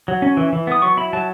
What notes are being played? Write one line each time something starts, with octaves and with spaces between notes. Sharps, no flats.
F#3
C#4
E3
E3
B3 D#6
F#3 C#6
E4 B5
F#3 A5